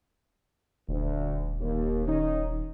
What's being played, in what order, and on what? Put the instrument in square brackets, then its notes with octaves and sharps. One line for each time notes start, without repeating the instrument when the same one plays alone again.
[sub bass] D#1 [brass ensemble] D2
[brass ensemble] D#2
D#3 C#4 D#4